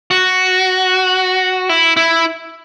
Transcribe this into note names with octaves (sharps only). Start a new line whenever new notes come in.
F#4
E4
E4